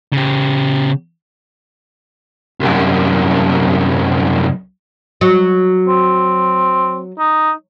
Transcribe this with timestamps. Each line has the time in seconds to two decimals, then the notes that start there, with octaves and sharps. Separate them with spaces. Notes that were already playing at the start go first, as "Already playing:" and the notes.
0.13 C#3 G4
2.60 C2 F#2
5.21 F#3
5.88 C4
7.19 D#4